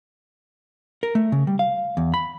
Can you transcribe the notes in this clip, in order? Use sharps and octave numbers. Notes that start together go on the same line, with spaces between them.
A#4
A3
C#3
G3
F5
E2
B5